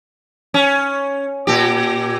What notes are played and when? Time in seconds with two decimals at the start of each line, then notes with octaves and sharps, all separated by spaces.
0.54 C#4
1.47 A#2 G4